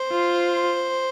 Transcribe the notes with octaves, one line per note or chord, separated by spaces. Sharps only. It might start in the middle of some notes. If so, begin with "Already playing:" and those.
Already playing: C5
F4